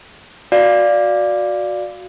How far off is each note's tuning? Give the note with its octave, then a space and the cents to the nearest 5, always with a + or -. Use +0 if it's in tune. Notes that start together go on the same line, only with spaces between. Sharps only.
F#4 -15 D5 +0 F5 +0